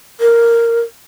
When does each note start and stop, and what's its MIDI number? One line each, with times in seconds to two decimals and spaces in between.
0.20 0.80 70